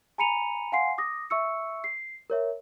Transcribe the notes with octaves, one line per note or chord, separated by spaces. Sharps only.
G#5 A#5 B5 C#7 D#7 F7
F5 F#5 G#5 C6 C7
D6 D#6 A#6
E5 C#6 E6 C#7
C7
A#4 C#5 E5